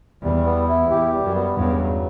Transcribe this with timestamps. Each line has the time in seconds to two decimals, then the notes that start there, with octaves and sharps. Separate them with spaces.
0.23 E2 G3
0.46 B3
0.69 E4
0.91 E2 G4
1.13 G3
1.24 F#2
1.35 B3
1.57 E2 G2 C#3
1.80 F#3